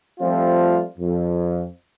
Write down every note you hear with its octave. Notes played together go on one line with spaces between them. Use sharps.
F3 G3 A3 C4 F4
F2